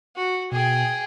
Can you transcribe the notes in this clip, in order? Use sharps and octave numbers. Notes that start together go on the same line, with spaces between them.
F#4
B2 G#4 G5